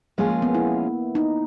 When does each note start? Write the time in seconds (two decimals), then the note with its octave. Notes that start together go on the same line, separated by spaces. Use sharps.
0.18 F3 G#3 A#3 C#4 F4 G#4
0.30 A#3
0.42 B3
0.55 E4
1.15 D#4